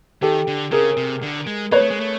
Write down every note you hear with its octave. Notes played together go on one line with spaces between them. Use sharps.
D#3 G4 A4
D3
C#3 G#4 A#4
C3
D3
G#3
A#3 B4 C#5
A3
G#3
A3